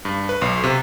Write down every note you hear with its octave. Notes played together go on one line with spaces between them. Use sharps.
G2
B4
B1
C3